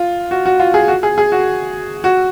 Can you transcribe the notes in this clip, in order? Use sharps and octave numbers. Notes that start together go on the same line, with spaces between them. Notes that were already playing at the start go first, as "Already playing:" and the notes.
Already playing: F4
F#4
F#4
F4
G#4
F#4
G#4
G#4
F#4
F#4